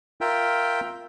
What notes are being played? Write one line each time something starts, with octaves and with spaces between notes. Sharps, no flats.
F4 A#4 E5 G5